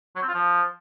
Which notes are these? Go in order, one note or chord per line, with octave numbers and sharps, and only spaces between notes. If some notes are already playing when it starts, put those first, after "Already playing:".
F#3
C4
F4
F3